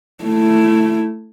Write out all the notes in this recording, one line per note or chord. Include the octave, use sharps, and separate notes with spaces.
A3 E4